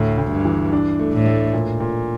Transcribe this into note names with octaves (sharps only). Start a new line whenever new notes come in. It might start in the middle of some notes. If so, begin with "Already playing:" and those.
Already playing: D2 A2
D2
G2
E3
D4
A3
A2
A3
A#2
A#2